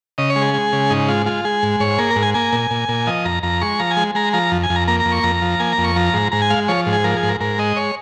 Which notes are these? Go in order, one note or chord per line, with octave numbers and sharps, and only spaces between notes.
C#3 D#5
C#5
G#3
G#4
G#3
C#3
G#2 D#4
G#3 F4
G#3 F4
G#3 G#4
G#2
G#2 C#5
A#3 G#4
A#4
G#2
G#5
A#3 G#5
A#2
A#2
A#2
F3 D#5
F2 A#5
F2 A#5
G#3 C#6
F3 A#5
G#5
G#3
G#3 A#5
F3 A#5
F2
G#5
F2
A#5
A#3 A#5
A#5
F2
C#6
F2 A#5
F3
A#3 G#5
A#5
F2
C#6
F3 A#5
G#2
G#2 A#5
G#5
G#3 F5
F3 C#5
G#2
G#4
F3 A#4
G#4
G#2
A#4
G#2 A#4
G#3 D#5
C#5